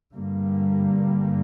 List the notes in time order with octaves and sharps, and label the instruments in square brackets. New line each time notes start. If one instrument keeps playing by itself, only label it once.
[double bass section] G2 D3 G3 A#3